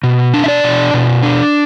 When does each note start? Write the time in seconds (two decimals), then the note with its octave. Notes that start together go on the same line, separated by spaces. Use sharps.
0.03 B2
0.34 D4
0.44 E5
0.48 D5
0.64 B2
0.94 B2
1.23 D4